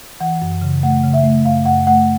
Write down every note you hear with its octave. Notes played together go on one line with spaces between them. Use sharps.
E3 F#5
F#2
C#3
A3 F#5
C#3
E5
A3
F#2 F5
F#2 F#5
A3 F#5